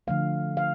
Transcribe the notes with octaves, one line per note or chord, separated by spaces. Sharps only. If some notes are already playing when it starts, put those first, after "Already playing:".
D3 F3 A3 F5
F5